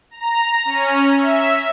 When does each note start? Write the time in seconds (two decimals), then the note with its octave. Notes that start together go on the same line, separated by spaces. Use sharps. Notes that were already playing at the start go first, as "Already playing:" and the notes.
0.11 A#5
0.65 C#4
1.16 E5